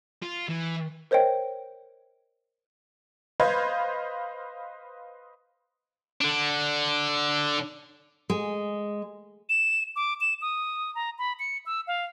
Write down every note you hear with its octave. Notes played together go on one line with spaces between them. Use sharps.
F4
E3
A#4 C5 C#5 D#5 G5
B4 C5 D#5 F5 B5 G#6
D3 D4
G#3
E7
D6
E7
D#6
A#5
B5
C#7
E6
F5